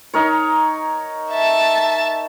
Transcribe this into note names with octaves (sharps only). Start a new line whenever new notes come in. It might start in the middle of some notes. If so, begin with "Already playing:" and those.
D#4 A#4 C#5
E5 A5